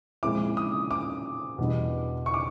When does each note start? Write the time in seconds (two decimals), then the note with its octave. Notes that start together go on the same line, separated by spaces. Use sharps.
0.23 A#2 F3 G#3 C4 E4 D6
0.57 D#6
0.91 D6
1.58 E2 B2 G3 B3 D4
2.26 C#6
2.34 D6